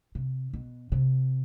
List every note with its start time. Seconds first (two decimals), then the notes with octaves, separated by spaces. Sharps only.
0.15 C3
0.53 B2
0.92 C3